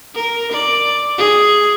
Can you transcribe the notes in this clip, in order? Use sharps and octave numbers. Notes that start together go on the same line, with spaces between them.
A#4
D5
G#4